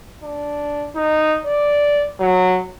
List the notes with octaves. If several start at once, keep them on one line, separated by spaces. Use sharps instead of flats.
D4
D#4
D5
F#3